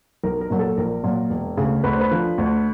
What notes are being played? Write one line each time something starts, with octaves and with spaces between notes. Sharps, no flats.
B1 A#4
A#4
A#2 F#3
A4
A#1 A#4
A#2 F#3
E1
D2 C#3
D2 B4
C5
B4
D3 F3
D2